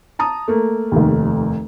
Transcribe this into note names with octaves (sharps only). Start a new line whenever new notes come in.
A5 A#5 D#6
A3 A#3
F1 D#2